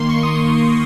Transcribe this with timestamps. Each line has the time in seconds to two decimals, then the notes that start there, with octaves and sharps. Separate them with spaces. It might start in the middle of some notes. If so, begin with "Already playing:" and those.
Already playing: D#3 A#3 C6
0.09 C#6
0.23 D#6
0.37 D#6